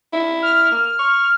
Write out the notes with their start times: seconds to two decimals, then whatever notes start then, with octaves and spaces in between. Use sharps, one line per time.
0.13 E4
0.42 F6
0.71 A#3
0.99 C#6